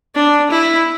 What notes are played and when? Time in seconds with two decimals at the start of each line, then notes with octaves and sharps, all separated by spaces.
0.15 D4
0.51 E4